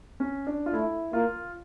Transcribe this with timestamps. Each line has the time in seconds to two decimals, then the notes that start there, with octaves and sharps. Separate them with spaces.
0.20 C#4
0.47 D4
0.66 F4
0.73 A3 E4
1.13 A#3 F4